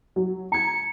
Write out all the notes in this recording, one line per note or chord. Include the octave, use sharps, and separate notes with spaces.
F#3
A#5 G#6 C#7